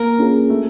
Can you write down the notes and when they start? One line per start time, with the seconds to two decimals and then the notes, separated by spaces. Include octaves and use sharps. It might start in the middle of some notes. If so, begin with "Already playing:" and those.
Already playing: A#3 A#4
0.18 C#4 F4 G#4
0.50 A3